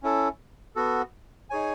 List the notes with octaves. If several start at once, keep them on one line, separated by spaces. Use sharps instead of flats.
C#4 E4 A4
B3 F#4 A4
D#4 G#4 C#5 G#5